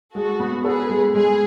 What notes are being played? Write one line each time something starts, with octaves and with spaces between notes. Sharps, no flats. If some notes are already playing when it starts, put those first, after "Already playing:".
G#3 F#4 A4
B3
G#4 A4 B4
G#3
G#3 G#4